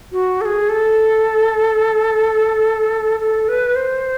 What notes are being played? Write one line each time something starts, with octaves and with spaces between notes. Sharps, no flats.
F#4
A4
G#4
A4
A4
B4
C5